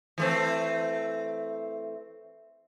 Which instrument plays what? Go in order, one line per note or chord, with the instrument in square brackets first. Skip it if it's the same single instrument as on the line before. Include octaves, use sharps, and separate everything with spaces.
[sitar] E3 A3 C4